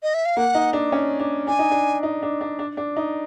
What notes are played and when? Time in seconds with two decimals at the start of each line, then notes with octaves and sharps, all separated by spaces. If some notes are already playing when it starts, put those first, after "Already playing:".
0.03 D#5
0.14 E5
0.25 F5
0.37 A#3 F#5
0.55 D#4
0.73 D4
0.92 C#4
1.20 D4
1.47 D4 G#5
1.59 D#4
1.71 D4
2.03 D#4
2.22 D4
2.41 D4
2.59 D4
2.77 D4
2.97 D#4